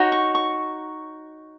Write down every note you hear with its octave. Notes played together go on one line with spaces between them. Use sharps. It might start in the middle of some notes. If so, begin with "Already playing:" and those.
Already playing: D#4 F#4 C#5
C#6
C#6